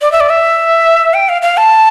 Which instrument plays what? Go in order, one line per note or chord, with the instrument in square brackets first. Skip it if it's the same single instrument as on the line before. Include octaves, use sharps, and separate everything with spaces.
[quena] D5
E5
D5
E5
G5
F5
F5
A5